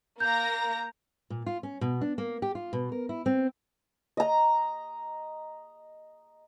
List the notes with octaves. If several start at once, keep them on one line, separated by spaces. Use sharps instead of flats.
A#3 A#5 G6 A#6
A#2
F4
C#4
B2
D4
A#3
G4
F4
B2
A#4
E4
C4
D#5 A#5